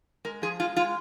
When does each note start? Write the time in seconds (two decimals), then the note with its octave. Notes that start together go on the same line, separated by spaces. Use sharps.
0.25 G#3 A#4
0.42 F3 G#4
0.60 G#3 F4
0.77 G#3 F4